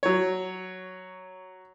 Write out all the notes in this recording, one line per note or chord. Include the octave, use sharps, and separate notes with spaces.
F#3 C#5